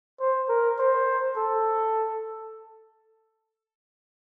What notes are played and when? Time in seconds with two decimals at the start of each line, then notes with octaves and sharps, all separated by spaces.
0.20 C5
0.49 A#4
0.79 C5
1.36 A4